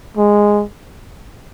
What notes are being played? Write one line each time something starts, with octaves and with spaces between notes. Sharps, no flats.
G#3